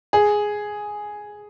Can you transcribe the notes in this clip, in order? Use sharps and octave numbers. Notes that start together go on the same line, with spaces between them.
G#4